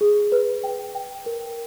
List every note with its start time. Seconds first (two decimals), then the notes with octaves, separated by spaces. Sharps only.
0.01 G#4
0.32 B4
0.64 G5
0.95 G5
1.26 A#4